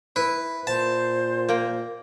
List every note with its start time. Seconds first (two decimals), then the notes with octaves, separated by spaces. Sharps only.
0.16 E4 B4
0.67 A#2 C5 A5
1.49 A#3 G5